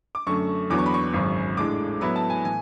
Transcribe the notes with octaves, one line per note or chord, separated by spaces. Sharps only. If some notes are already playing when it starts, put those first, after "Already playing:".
D6
F#2 D3 A3 C#6
E2 D3 F#3 B3 D6
C#6
B5
C#6
G#1 F#2 C#3
A2 G#3 D4 D6
A2 F#3 B3 E4 B5
A5
G#5
A2 E3 G#5